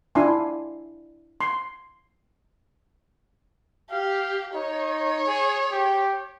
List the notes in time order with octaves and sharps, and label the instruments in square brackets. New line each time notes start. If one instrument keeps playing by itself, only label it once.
[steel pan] D4 E4 F4 G#5 C6
C6
[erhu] G4 [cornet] F5
[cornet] D#4 [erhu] C#5
[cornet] G#4
G4